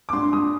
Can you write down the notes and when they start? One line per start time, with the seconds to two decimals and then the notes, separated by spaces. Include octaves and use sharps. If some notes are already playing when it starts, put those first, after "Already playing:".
0.09 D6
0.13 G2 C6
0.33 G2 D#6